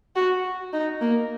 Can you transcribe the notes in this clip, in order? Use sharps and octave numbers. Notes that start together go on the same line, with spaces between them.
F#4
D#4
A#3